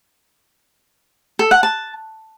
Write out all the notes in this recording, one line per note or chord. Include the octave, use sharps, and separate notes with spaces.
A4
F#5
A5